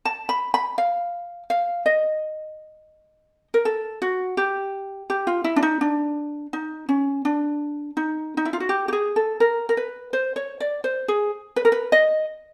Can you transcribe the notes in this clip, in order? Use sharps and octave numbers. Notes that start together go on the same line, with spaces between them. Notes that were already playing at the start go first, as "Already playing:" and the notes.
A5
B5
B5
F5
F5
D#5
A#4
A4
F#4
G4
G4
F4
E4
D4
D#4
D4
D#4
C#4
D4
D#4
D#4
E4
F4
F#4
G4
G4
G#4
A4
A#4
A#4
B4
C5
C#5
D5
C5
G#4
B4
A#4
B4
D#5